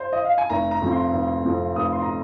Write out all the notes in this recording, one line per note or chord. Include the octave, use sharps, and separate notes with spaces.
C5
D#5
F5
G#5
F1 A#5
A#5
F2 F3 C4
C6
F1
F2 F3 C4
F1 D#6
C6
A#5